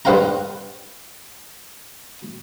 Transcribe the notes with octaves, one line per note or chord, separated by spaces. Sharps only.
G2 B4 C5 F5 G5 A#5